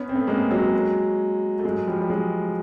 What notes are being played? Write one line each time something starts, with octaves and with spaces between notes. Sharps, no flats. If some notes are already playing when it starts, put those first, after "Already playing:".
Already playing: B3 C#4
C4
A3 B3
G#3 A#3
F#3 G#3
A3
F#3 G#3
F3 G3
G3
F#3 G#3